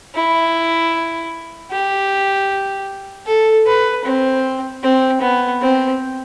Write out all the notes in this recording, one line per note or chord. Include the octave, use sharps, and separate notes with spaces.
E4
G4
A4
B4
C4
C4
B3
C4